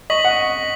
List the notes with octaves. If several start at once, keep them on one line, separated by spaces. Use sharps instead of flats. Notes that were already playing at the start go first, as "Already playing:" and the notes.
D#5 C#6 B6 F#7
F#5